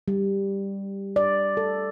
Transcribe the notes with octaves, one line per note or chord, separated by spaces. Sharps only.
G3
D5
A4